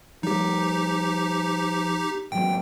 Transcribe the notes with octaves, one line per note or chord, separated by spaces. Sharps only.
F3 G3 D#4 G4
G#1 F#3 G5